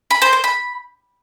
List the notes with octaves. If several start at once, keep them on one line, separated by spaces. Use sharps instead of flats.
B5
C5
C5
B5